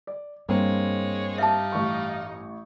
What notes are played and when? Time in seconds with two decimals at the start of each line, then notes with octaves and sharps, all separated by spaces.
0.07 D5
0.49 G2 G#3 A#3 C4 C#5
1.38 G3 D#4 E5 F5 A5
1.72 A1 C#6